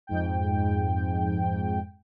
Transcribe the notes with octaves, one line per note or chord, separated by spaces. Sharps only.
F2 G#2 G5